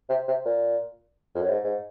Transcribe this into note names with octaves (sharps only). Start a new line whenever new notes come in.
C3
C3
A#2
F2
F#2
G#2
G#2